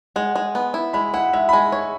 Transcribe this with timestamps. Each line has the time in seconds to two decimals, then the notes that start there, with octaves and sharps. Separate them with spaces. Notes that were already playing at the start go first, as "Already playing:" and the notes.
0.16 G#3 F#5
0.36 G#3
0.55 B3
0.74 E4
0.93 G#3 B5
1.14 E4 F#5
1.33 G#3 E5
1.49 B5
1.53 G#3 G#5
1.72 C#5